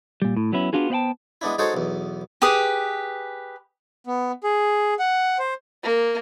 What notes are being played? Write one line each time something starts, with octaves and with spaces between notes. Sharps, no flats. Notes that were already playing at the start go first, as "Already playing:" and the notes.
A#2 G3
A2
F#3 B3 C#4 E4
B3 D4 F4 F#4 G#4
B3 C5 E5 F#5 G5 A5
G#3 B3 D4 E4
G#3 D#4 F#4 A4 C5 C#5
B1 E2
G4 G#4 B4 D#6
B3
G#4
F#5
C5
A#3